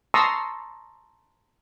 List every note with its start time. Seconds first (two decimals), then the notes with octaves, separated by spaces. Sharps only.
0.14 A5 A#5 C6 C#6 D#6 E6